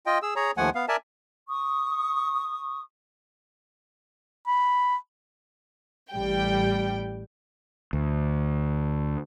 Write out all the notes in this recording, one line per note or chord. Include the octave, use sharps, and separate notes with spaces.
F4 D#5 G5
G#4 E6
G#4 C#5 A#5
D#2 F3 A3 F#5 G#5
B3 F5
A#4 D5 E5 G#5 A5
C#6 D#6
B5
A1 G3 G5
D2